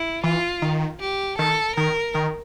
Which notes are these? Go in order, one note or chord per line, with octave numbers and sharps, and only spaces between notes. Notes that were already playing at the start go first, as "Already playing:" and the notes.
Already playing: E4
E3 F4
D#3
G4
D#3 A4
D#3 A#4
D#3